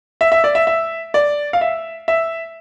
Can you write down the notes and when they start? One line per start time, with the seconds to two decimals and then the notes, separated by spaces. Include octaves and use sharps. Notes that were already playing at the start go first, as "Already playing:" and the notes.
0.21 E5
0.32 E5
0.44 D5
0.55 E5
0.67 E5
1.14 D5
1.53 F5
1.61 E5
2.08 E5